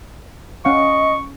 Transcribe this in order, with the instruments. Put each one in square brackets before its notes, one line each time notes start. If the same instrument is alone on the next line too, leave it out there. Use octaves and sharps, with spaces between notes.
[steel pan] C#4 F5 F#5 [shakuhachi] D#5 [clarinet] C#6